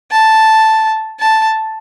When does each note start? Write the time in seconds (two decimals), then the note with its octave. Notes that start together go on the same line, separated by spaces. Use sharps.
0.11 A5
1.20 A5